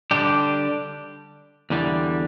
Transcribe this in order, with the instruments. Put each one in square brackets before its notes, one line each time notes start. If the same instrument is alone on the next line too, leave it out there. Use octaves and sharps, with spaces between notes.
[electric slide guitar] D3 G3 D4 G4
E2 D3 G3